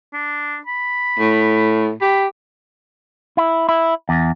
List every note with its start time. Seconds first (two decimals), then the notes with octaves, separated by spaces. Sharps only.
0.13 D4
0.66 B5
1.19 A2
2.01 G4 B5
3.37 E4
3.69 E4
4.09 E2